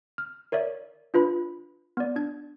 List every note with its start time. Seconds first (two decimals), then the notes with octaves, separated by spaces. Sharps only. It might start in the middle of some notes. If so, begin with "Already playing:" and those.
0.18 F6
0.52 A#4 C#5 D5 E5
1.14 D4 F4 B4 B5
1.97 B3 D5
2.16 D4 G#6